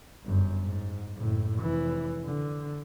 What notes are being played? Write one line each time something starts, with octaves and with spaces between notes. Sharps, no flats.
G1 F#2
G#2
F#1 A2
F1 E3
D3